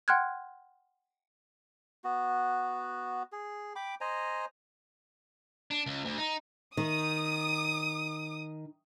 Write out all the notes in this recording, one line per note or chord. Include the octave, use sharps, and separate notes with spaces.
F#5 G5 C6 F6 F#6 G#6
B3 F#4
G#4
G5 B5 D6
C5 D#5 G#5 A#5
D4
C#2
D2
D#4
D#3 D#6